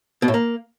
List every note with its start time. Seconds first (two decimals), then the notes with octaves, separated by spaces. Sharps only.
0.22 B2
0.28 A2
0.34 A#3